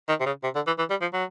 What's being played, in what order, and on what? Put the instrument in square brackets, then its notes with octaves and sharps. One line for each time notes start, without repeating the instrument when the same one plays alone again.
[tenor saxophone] D#3
C3
C#3
C3
D3
E3
E3
G3
F3
F#3